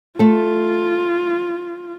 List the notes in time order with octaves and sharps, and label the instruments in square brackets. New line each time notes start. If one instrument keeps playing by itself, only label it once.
[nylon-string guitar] A3 A4 [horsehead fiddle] F4